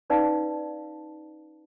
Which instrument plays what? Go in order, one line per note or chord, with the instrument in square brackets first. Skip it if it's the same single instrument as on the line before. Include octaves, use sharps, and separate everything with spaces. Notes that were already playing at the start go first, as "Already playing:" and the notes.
[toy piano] C#4 D#4 B4 D5 F5 A5